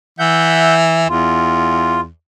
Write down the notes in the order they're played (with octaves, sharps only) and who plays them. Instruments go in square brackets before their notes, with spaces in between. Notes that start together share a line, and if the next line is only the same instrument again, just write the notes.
[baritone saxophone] E3 [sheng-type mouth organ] E5 F#5 G6
[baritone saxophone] E2 [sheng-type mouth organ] F4